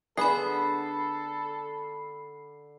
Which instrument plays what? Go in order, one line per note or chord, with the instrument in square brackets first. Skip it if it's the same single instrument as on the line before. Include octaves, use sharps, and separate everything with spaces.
[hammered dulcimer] D3 [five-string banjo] B3 G#4 [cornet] A4 [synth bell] B5 C7